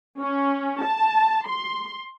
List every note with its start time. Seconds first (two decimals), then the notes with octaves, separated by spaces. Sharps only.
0.21 C#4
0.85 A5
1.49 C6